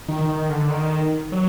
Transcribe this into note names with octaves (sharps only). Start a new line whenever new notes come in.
D#3
D#3
D3
D#3
F#3